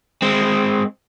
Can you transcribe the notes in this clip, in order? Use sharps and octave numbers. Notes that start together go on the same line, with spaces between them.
G#3 C4